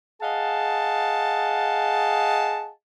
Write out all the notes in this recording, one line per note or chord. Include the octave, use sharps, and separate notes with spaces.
G#4 D#5 F5 F#5 A5